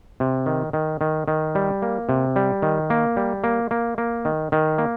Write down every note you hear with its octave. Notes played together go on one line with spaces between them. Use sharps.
C3
D#3
D#3
D#3
D#3
G3
A#3
C3
G3
D#3
A#3
G3
A#3
A#3
A#3
D#3
D#3
A#3